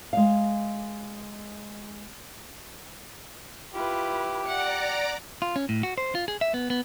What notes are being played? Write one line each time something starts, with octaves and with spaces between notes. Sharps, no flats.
G#3 F5
E4 F4 G4 B4
D5 F#5 A#5 D6 C#7
F4
C#4
A2
F#4
C5
F4
G#4
E5
B3
B3